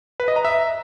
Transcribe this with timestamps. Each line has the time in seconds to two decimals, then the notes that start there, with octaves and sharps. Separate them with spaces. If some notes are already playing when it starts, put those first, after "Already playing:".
0.20 B4
0.28 D#5
0.36 A#5
0.45 E5